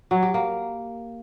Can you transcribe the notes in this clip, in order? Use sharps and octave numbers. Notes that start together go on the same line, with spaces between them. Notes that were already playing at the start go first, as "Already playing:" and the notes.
F#3
G4
A#3